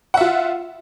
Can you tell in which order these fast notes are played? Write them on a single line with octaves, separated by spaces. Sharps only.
F#5 E5 F4